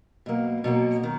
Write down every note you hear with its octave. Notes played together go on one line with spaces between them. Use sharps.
B2 F#3 A#3
B2 F#3 A#3
D#3